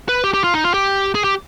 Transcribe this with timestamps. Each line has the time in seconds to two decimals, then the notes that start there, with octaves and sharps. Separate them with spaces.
0.09 B4
0.24 G4
0.34 G4
0.44 F4
0.54 D#4
0.64 F4
0.74 G4
1.15 G#4
1.24 G4